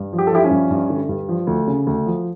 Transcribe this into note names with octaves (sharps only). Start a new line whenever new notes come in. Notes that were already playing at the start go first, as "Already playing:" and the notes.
Already playing: G2
F3
G4
A4
F3 E4 G4
C#4 E4
G2
G2
D3
G2
F3
D2
C#3
D2
F3